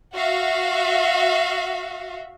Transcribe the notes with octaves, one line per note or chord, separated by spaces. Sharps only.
F#4 E5 F5